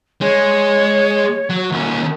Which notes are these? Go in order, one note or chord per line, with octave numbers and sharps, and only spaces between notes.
G#3 C#5
F#3
D#2 C#4